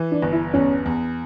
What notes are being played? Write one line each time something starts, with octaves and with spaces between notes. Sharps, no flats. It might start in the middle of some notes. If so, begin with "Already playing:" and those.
Already playing: E3
D4
G1
E4
E2 C#4
E2